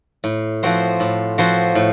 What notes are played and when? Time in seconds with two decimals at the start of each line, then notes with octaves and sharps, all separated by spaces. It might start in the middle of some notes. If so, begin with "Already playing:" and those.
0.24 A2
0.63 F3 C4 F#4 C5
1.00 A2
1.38 F3 C4 F#4 C5
1.75 A2